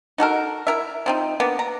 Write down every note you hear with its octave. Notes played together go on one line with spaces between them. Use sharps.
D#4 F#4 A4 A#4
E4 A#4 E5
F3 C4 D#4
A#3 B3 D4
A#5